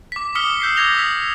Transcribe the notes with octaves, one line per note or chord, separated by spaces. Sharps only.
D6 B6
D6 D#6 F6 B6 C#7 G7
E6 G6 B6 C7
D6 E6 G#6 A#6 F7 G7
D#6 E6 B6